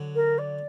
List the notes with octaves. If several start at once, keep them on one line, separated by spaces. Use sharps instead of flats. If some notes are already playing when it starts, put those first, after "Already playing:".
Already playing: D3 F#3
A#4
D5